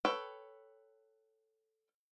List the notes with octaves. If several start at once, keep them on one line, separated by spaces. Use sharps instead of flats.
A4 B4 C#5 G5